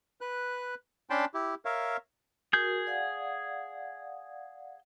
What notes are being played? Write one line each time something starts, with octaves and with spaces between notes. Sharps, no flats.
B4 F#6
C#4 D4 G5 A5 B5 C6
E4 G4
A#4 C#5 E5 F5
F#4 G#4 A#4 G6
D5 F5 F#5